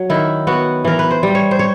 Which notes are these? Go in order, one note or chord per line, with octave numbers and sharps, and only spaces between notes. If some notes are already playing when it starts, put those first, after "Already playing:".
Already playing: F#3
D#3 E4
B3 F#4
E3 A#4
B4
C5
G3
C#5
C5
C#5